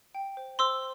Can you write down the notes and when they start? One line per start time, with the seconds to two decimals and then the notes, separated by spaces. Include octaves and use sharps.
0.15 G5
0.37 C5
0.59 C5 C6 E6